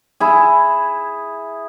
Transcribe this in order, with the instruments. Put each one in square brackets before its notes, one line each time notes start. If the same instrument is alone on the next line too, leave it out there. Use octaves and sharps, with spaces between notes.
[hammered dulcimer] E4 G#4